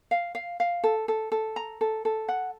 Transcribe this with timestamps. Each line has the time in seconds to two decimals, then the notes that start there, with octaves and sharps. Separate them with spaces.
0.11 F5
0.35 F5
0.60 F5
0.84 A4
1.08 A4
1.32 A4
1.56 A#5
1.81 A4
2.05 A4
2.28 F#5